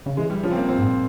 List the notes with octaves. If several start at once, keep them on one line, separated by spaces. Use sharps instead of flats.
C#3
E3 G#3
G3
C#3 F3
C4
A#3
A#2 C4
G#2
A#2